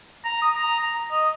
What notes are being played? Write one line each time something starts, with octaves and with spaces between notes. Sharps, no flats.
A#5
D#6
A#5
A#5
D#5